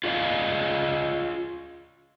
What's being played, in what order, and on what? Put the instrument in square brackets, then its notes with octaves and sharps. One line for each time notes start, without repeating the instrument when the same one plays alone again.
[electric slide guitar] F4 G#4 D5 D#5 F5